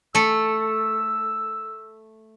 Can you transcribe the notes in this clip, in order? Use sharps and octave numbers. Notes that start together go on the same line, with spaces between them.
A3 A4 E6